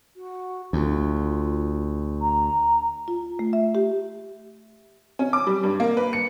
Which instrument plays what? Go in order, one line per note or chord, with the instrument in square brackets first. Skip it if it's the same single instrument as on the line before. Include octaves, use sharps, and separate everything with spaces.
[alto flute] F#4
[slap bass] D2 [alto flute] F4
[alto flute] A#5
[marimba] F4
A3
E5
G4
[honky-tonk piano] C#4
D6
G3
G2
A#3
B4
C#7